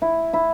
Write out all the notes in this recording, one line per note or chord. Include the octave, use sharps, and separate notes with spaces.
E4
E4